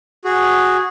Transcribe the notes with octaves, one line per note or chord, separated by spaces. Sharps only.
F#4 G#4